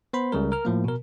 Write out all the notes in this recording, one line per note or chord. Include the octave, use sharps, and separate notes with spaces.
B3 C5 B5 C6
C#2 C#3 G3 A#4
A#4 F6
A2 F3 A#3
B2 A#4